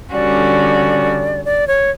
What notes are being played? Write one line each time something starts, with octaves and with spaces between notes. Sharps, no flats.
D3 G3 C#4 F#4 D5
D5
C#5